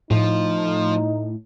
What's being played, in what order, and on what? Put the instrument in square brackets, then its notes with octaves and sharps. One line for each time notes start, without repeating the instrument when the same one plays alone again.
[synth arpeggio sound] A2 [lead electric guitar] F3 [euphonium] D#4